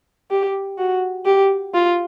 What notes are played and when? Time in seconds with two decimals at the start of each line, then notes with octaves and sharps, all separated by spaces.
0.31 G4
0.79 F#4
1.26 G4
1.74 F4